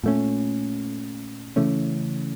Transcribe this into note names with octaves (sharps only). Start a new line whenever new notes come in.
A#2 A3 C#4
C#3 E3 A3 C#4